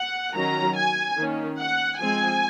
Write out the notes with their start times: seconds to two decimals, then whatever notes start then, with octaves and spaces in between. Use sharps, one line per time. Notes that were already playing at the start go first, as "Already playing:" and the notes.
Already playing: F#5
0.35 D#3 F#3 C#4 A#5
0.76 G#5
1.17 D#3 A#3 C#4
1.59 F#5
2.00 F3 G#3 C4 G#5